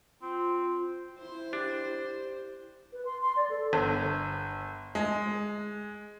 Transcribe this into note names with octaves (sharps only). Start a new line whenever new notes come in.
C4 F4
E4 C5
D4 G4
B4
C6
C6
D5
A4
G1
G#3